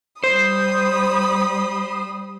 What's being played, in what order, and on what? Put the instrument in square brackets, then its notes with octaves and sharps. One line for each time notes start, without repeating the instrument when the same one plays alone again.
[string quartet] G3 B5 D#6 [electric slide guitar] C5